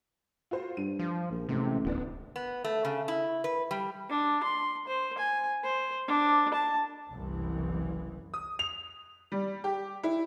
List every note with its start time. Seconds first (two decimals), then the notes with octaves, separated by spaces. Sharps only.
0.51 F4 F#4 C5
0.77 G2 D#7
0.99 F3
1.31 A#1
1.49 A1 G#2 C3
1.85 D1 E3 B3 D4
2.36 B3
2.64 A3
2.85 C#3
3.08 E4
3.44 B4
3.71 G3
4.10 D4
4.43 C6
4.87 C5
5.18 G#5
5.63 C5
6.07 D4
6.54 A5
7.11 F#1 C2 E3
8.34 D#6
8.59 F7
9.32 G3
9.64 G4
10.03 E4